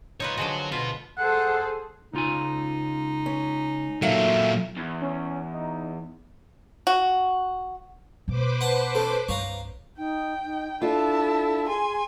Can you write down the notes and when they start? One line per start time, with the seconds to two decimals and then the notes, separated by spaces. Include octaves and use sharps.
0.20 C2 D#4 F4 B4 C#5
0.37 D3 F3 G#3 F#4 C#5
0.72 F4 F#4 B4
1.18 G#4 A4 C5 F#5
2.13 C#2 D#4 F4 G#5
3.26 C#4
4.02 A#2 F#3 A4 E5 F5
4.77 E2
5.01 C#4
5.53 D#4
6.87 F#4
8.28 B2 B3 B4 C5 D6
8.61 F#5 A5
8.95 C#4 A4
9.28 C2 G2 C#5 F5 A#5
9.98 D#4 G5
10.45 D#4
10.82 D4 E4 F4 A4 A5
11.69 G#4 G#5 C6